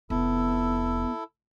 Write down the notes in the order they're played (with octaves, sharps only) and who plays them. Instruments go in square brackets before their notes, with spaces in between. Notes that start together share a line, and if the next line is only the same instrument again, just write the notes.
[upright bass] F1 [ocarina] B3 [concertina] E4 A4